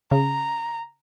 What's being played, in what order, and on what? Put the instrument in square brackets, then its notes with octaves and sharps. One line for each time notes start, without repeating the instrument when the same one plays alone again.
[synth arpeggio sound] C#3 [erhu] A#5